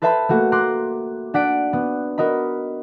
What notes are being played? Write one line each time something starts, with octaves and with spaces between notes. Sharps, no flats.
A4 B4 C5 E5 A5 B5
A3 A#3 F#4
A#5 C6 D6 F#6
D4 F#5 B6 D7
B3
F#4 A#4 D#5 B5